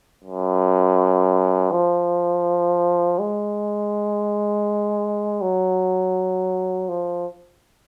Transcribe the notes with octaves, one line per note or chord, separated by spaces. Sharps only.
F#2
F3
G#3
F#3
F3